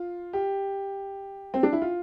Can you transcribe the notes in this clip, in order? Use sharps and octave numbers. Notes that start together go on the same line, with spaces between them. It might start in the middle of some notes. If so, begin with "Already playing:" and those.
Already playing: F4
G4
C4
D4
E4
F4